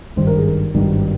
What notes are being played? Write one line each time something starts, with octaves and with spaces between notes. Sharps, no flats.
G#1 G2 D#3 C5
A#4
G#4
A#4
G#1 G2 D#3